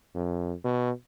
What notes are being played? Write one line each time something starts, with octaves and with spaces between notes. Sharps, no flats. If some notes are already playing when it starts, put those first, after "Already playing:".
F2
B2